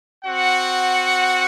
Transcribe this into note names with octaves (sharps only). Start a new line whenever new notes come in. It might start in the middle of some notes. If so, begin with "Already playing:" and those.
C4 F#4 F#5